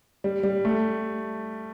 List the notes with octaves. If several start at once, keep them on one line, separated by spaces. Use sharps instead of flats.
G3
G3
A3